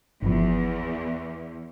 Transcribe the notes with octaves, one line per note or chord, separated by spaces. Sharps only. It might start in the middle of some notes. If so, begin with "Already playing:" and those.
G1 E2 F3